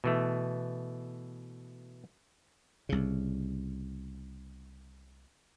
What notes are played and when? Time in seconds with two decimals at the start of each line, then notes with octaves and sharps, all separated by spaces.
0.04 B2 E3 A3
2.89 C2 C#3